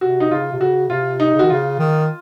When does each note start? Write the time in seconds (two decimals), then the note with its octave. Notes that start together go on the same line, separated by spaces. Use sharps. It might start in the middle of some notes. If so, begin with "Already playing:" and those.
0.01 C3 F#4
0.20 D#4
0.31 C#3 F4
0.52 C3
0.61 C#3 F#4
0.90 C3 F4
1.20 D#4
1.34 C#3
1.39 D#3 F#4
1.50 C#3 F4
1.79 D#3